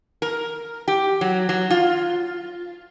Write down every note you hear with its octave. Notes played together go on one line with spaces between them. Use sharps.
A#4
G4
F#3
F#3
F4